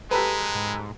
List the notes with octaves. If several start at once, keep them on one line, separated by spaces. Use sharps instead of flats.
G#3 G4 A4 B4 A#5 B6
G#2